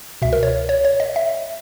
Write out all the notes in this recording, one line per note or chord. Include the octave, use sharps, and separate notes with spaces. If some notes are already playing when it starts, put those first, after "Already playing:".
C#2 B2 E5
A#4
C#5
C#5
C#5
D#5
E5